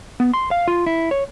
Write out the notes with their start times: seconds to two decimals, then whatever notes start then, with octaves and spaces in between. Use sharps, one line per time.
0.20 B3
0.34 C6
0.51 F5
0.68 F4
0.87 E4
1.11 C#5